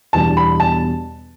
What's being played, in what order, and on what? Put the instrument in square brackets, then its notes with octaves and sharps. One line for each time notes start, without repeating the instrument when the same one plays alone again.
[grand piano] E2 B2 G3 D4 [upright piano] A5
[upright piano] B5
A5